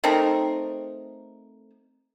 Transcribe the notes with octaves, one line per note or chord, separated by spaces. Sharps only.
A3 C4 D#4 A#4